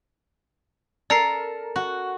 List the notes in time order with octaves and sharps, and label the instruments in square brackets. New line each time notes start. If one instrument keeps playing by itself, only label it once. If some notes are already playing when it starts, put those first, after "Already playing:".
[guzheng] A4 A#4 [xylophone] D5 A#5 C7
[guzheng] F#4